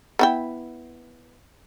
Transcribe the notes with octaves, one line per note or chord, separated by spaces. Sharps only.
B3 E4 G5